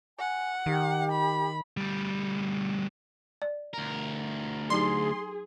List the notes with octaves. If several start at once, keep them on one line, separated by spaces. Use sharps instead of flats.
F#5 G#5
D#3 G4
B5
D2 G3
D5
D2 A#4
F#3 D#4 G4 G#4 C6